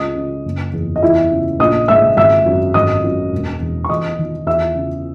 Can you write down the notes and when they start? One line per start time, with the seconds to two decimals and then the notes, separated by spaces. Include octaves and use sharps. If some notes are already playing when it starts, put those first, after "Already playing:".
Already playing: C#2 D#5 D#6
0.16 C#3
0.45 F#1
0.73 E2
0.96 D#5
1.02 E2 E4 E5
1.32 C#3
1.59 A#1 D#5 D#6
1.88 G#2 E5 E6
2.17 G#1 E5 E6
2.46 F#2
2.74 G#1 D#5 D#6
3.04 F#2
3.32 E1
3.61 E2
3.84 C#6
3.89 E2 D#5 D#6
4.19 D#3
4.46 E2 E5 E6
4.75 C#3